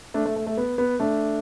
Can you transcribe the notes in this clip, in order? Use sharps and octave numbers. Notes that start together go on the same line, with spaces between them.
A3 D4
A3
A3
A3
B3
B3
A3 D4